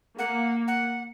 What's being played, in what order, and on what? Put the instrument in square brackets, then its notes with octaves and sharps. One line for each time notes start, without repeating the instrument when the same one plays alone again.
[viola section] A#3 [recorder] F#5
[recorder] F#5